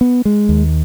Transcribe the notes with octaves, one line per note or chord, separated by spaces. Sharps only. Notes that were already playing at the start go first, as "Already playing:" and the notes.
B3
G#3
D#2